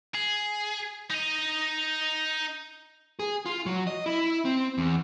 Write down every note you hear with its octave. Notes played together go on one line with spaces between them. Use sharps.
G#4
D#4 D#5
G#4
F4
F#3
D#5
E4
C4
E2